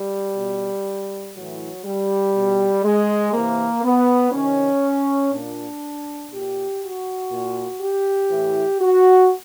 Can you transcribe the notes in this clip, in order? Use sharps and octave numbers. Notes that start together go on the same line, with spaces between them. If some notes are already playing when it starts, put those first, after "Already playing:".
Already playing: G3
B2
A2 E3 F#3
G3
B2
G#3
C3 E3 A#3
B3
C3 D#3 C#4
A#2 D4
A#2 G4
F#4
A#2
G4
A2 E3
F#4